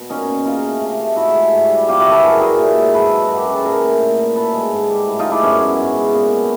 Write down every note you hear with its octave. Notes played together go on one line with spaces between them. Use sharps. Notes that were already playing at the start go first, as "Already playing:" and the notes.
Already playing: B2
A#2 C#4 D#4
A#2
C#3 D#4 F4
A3
C3
A3
G#2 E4 F#4
G#3
G2
G3
C3 F4 G4
E4 F#4
F#3
A4 B4
G2 G#4 A#4
G3 F#4 G#4
A#2
G#3
G#2 A4 B4
F#3
F#2 F#4
G4
G#3 G#4
A4
A#2 G#4 A#4
A3
A#2
A3
A2 A4 B4
G#3
G#2
G3
A2
D#4 F4
G#3
D4 E4
F#2 B3 C#4
F#3
G#2
G#3
A#2 B3
A3